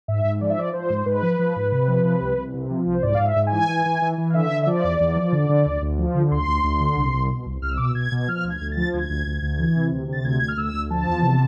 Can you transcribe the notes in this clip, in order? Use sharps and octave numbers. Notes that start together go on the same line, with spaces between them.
G#2 E5
G#2
F3 D5
E5
F3 D5
F3 C5
G#2
C5
G#2 B4
F3
F3
G#2
C3
F3
C3
C2
C2
C3
F3
C2
C5
G#2 D5
F5
G#2 E5
G#2
G#5
E3
E3
E3
E3
E3
F5
D3 E5
D3
E5
F3 D5
E2
E2
F3
D3
D3
D2
D2
F3
D3
D2 C6
D2
D2
D3
C2
C2
B2
C2
C2 F6
E6
B2 D6
E6
B2 G#6
B2
G#6
F3 F6
D2
G#6
D2
F3 A6
D2 G#6
D2
D2
D2
E3
C3
D2
C3 A6
D2 G#6
D2 G#6
F6
D2 E6
D2
F3 A5
E2
C3